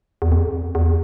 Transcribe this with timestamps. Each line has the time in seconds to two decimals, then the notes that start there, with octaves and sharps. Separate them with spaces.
0.22 E2
0.32 F2
0.75 E2